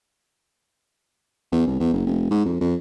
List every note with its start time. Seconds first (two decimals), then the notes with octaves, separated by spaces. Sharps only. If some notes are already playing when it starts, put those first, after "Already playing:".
1.52 E2
1.67 C2
1.80 E2
1.94 F#1
2.06 F1
2.31 G#2
2.45 F2
2.61 F2